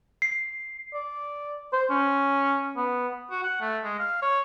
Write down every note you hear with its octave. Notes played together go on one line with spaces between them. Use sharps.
C7
D5
C5
C#4
B3
F#4
F#5
A3
G#3
F5
C#5